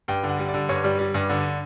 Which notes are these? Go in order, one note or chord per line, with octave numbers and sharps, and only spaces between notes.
G2 G5
D3
F#5
G3
D5
D3
G2 C#5
G3
G3
G2
D3